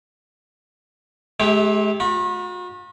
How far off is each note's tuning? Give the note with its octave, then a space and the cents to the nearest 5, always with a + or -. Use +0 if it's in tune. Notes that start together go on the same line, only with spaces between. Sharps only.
G#3 +45 E4 -25 G4 +10
F#4 -45 B5 -40